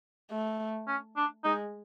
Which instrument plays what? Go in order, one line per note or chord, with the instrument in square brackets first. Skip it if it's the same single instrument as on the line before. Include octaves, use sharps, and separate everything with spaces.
[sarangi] A3
[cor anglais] C#4
D4
[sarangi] G#3 [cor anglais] D#4